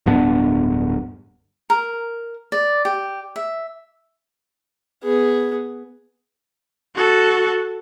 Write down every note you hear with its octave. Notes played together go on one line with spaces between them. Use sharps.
D1 G2 B3 D4
A#4
D5
G4
E5
B3 G#4
F#4 A4